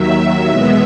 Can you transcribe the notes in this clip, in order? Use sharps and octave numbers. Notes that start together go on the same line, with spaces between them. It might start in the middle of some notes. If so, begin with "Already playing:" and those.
Already playing: D#2 D#3 F#3 E5
E2 B2 G#3 B3